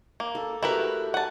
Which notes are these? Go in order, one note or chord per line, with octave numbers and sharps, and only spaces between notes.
A#3
A4
A3 E4 F#4 G4 A#4 B4
F#5 G#5 A5